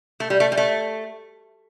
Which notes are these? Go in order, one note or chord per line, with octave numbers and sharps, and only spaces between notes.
A3
G3
A3
G3
A3